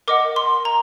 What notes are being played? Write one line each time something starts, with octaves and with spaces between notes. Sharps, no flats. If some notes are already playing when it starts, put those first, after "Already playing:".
A#4 D#5 F#5 D6
C6
A#5